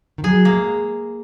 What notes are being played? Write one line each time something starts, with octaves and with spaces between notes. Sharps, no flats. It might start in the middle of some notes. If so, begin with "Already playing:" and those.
D#3
F#3 G#4
A#3
G#3